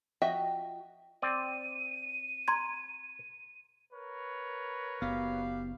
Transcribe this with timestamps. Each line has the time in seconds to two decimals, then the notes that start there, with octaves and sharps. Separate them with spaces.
0.22 F3 F#4 D#5 E5 G5
1.22 C4 D5 D#7
2.48 A#5 C6 G#6
3.92 A#4 B4 C#5
5.02 F#1 B3 F#4 G4 F5